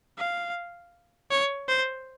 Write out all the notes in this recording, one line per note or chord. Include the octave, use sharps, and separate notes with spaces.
F5
C#5
C5